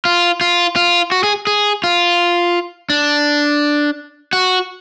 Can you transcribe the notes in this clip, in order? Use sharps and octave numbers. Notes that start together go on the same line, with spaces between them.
F4
F4
F4
F#4
G#4
G#4
F4
D4
F#4